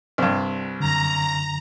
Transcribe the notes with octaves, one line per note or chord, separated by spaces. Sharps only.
C2 G2
F#2 D3 A#5